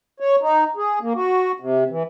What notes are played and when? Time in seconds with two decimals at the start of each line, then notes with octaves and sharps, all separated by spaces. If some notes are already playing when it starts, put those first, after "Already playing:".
0.20 C#5
0.41 D#4
0.77 G#4
1.01 A#3
1.15 F#4
1.60 C3
1.90 E3